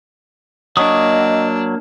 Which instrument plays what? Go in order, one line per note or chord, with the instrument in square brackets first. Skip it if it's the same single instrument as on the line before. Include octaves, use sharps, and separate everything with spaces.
[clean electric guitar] F#3 [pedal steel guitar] A#3 C#6 D#6 [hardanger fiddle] D4 [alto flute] D#5